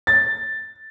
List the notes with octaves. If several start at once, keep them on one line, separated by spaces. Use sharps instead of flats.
A6